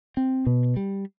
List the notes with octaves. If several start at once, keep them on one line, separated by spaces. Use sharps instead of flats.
C4
B2
G3